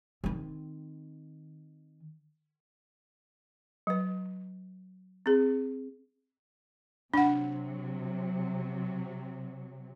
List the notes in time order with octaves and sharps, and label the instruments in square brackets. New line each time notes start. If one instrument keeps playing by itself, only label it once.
[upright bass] D#3 C4
[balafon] F#3 B4
C4 G#4
[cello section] C3 F#3 [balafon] D4 F#5